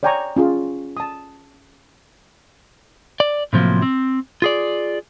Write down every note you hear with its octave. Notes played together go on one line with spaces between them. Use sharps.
C#5 D5 G5 G#5 A#5 C#6
C#4 F4 G#4
A5 D#6
D5
A2 C3 F3 F#3 A#3
C4
F4 G#4 D5